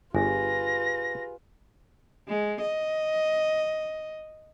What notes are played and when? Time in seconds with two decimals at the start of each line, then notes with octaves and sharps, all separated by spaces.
0.15 G1 F4 G4 G#4 B4 G#5 A#6
2.28 G#3
2.61 D#5